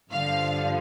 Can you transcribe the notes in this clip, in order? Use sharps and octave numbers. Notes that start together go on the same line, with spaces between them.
G2 D3 F3 F5